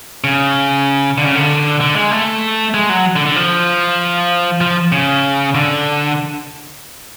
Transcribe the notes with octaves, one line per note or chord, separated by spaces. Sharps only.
C#3
D3
C#3
D3
D3
G#3
A3
G#3
F#3
D3
D3
F3
F3
C#3
D3